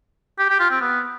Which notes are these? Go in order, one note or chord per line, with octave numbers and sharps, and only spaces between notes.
G4
G4
F4
C4
B3